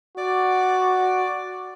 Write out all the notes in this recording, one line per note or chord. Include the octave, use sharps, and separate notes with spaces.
F#4 D5 D6